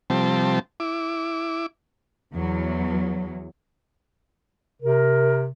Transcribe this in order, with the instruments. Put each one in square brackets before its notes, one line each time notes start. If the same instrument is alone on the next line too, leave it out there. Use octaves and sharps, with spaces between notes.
[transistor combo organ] C3 F3 G3 C4 A5
E4 D6
[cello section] E2 F#3
[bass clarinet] C3 [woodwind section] A#4